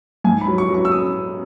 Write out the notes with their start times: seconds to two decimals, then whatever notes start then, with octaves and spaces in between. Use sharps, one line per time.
0.24 G#2 G#5
0.41 B5
0.47 F#3
0.58 C#6
0.69 F#3
0.74 C#6
0.85 E6
0.92 D#6